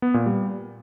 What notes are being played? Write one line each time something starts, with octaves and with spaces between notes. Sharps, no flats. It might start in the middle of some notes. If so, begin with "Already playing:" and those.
B3
A#2
G3